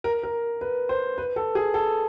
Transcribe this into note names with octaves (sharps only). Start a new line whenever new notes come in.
A#4
A#4
B4
C5
B4
A4
G#4
A4